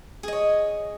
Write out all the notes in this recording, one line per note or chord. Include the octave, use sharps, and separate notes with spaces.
G#4 C#5 D#5